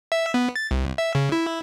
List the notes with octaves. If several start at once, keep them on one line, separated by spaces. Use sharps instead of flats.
E5
B3
A6
C2
E5
C#3
E4